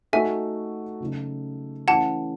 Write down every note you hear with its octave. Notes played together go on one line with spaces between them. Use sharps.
A3 D#4 F#4 A4 E5 G#5
C#3 F#3 A3 D#4
E3 A3 C#4 F#5 A5